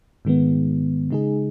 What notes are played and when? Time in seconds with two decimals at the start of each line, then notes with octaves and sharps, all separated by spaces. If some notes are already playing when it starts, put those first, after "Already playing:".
0.25 G#2 D#3 G#3 B3
1.11 C#3 G#3 D#4 G#4